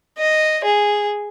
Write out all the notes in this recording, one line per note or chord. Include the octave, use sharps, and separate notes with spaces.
D#5
G#4